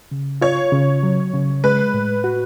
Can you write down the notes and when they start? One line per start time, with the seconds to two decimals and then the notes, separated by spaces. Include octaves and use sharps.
0.11 C#3
0.41 F4 C#5
0.72 C#3
1.03 F#3
1.33 C#3
1.64 G#3 B4
1.94 A2
2.24 F#4